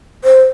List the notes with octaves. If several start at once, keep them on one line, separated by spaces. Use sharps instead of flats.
C5